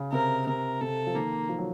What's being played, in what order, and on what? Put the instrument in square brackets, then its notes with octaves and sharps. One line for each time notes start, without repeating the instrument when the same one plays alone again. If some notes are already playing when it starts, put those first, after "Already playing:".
Already playing: [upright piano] C#3
[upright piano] C3 [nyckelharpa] A#4
[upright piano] C3 [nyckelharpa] A#4
[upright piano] C3 [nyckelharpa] A4
[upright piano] F3
[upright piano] D#3 [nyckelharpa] A#3
[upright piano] F3
F#3